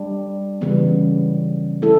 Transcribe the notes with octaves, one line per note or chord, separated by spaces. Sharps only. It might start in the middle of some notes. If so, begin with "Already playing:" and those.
Already playing: G3 D4
C#3 E3 G3 B3
A3 C#4 E4 A4